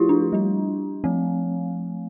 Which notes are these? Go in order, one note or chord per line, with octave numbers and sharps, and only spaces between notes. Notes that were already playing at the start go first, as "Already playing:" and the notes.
Already playing: F3 A3 E4 F4 G4
D4
G3 D4
F3 A3 C4